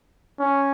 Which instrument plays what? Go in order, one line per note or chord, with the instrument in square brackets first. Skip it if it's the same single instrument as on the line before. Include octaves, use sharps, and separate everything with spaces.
[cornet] C#4